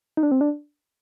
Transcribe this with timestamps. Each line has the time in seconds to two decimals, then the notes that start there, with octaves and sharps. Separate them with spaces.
0.17 D#4
0.23 D4
0.31 C4
0.41 D4